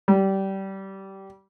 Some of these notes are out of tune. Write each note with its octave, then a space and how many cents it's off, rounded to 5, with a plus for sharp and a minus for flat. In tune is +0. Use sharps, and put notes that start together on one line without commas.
G3 -20